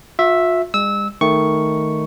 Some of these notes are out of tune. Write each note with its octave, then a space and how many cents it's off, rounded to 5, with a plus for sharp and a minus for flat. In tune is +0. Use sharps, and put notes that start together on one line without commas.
F4 +45 E5 +0
G#3 -45 E6 -20
D#3 +0 A3 +0 C#6 +0